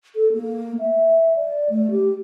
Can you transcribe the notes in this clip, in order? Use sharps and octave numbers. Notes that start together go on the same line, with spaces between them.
A4
A#3
E5
D5
A3
G4